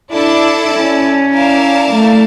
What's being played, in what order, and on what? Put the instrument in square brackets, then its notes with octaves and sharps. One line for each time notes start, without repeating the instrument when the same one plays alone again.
[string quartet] D4 [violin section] E4 A4 D5 A5
[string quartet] C#4
[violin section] E4 A#4 D5 F5 A5
[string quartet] A3